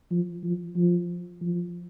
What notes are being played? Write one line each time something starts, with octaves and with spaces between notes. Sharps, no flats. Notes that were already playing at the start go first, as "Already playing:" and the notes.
F3
F3
F3
F3